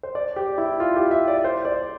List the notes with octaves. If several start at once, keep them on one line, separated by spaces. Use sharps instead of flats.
C5
D5
G4
E4
F4
G4
E5
D5
C5
D5